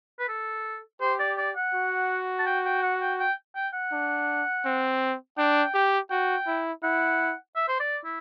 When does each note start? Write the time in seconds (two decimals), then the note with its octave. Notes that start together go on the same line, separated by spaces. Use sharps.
0.19 B4
0.29 A4
1.01 G4 C5
1.20 D5
1.38 D5
1.56 F#5
1.74 F#4
2.39 A5
2.47 G5
2.65 G5
2.83 F#5
3.01 G5
3.20 G5
3.56 G5
3.74 F#5
3.92 D4
4.65 C4
5.38 D4 G5
5.74 G4
6.10 F#4 G5
6.47 E4
6.83 E4 F#5
7.56 E5
7.69 C5
7.80 D5
8.05 E4